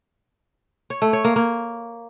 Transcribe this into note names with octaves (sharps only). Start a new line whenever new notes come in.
C#5
A3
C#5
A#3
A#3